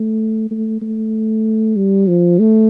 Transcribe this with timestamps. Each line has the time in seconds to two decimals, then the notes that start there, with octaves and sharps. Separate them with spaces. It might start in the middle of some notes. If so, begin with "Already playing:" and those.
Already playing: A3
0.50 A3
0.82 A3
1.76 G3
2.08 F3
2.39 A3